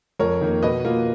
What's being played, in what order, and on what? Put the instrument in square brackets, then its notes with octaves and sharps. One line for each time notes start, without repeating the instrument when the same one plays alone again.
[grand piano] F2 A#4 C#5
D#3 A#3
B2 B4 D#5
A#3 F4